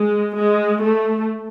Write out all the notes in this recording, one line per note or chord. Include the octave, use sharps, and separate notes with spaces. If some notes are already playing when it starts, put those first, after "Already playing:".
Already playing: G#3
G#3
A3